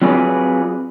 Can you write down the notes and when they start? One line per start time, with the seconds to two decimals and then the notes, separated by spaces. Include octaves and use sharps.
0.02 F#3 C4 F4 G#4 B4 D5